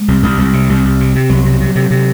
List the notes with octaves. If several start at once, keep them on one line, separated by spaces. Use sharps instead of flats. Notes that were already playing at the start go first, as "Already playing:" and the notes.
Already playing: G#3
C2
C2
C2
C3
C2
C2
C3
C3
C2 F#3
C3
C3
C3
C3